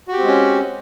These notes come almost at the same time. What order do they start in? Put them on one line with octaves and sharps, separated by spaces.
F#4 G4 C4 G#3 C#4